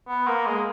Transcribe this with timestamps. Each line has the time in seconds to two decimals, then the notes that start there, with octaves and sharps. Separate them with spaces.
0.08 B3
0.28 A#3
0.46 G#3